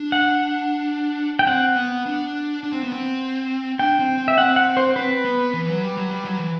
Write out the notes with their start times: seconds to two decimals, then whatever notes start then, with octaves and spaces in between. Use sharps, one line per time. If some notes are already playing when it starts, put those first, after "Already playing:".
Already playing: D4
0.12 F#5
1.39 G5
1.47 C4 F#5
1.76 B3
2.06 D4
2.64 D4
2.72 C4
2.83 B3
2.93 C4
3.79 D4 G5
3.99 C4
4.18 C4
4.28 E5
4.38 C4 F#5
4.56 F#5
4.77 C5
4.96 C4 B4
5.25 B3
5.54 E3
5.69 F#3
5.83 G3
5.97 F#3
6.11 G3
6.25 F#3
6.37 E3